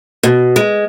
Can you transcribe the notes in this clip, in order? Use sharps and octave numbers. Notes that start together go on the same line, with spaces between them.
B2
G#3